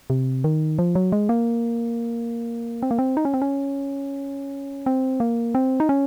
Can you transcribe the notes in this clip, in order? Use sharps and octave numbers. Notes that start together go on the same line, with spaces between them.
C3
D#3
F3
F#3
G#3
A#3
C4
A#3
C4
D#4
C#4
C4
C#4
C4
A#3
C4
D#4
C#4